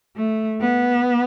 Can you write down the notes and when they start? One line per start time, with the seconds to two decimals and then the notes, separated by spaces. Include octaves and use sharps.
0.16 A3
0.61 B3